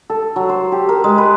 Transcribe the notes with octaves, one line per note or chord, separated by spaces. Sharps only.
A4
F#3
C5
G4
A#4
G#3
B4